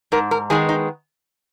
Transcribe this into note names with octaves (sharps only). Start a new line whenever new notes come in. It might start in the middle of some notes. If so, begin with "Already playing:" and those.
G#2 A#4
A#4
D#3 G#3 B3 G#4
D#4